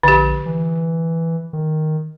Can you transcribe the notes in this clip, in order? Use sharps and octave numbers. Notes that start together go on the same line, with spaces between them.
A#1 D3 G4
E3
D#3